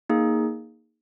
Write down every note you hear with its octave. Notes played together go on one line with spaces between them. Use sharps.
A#3 D#4 G#4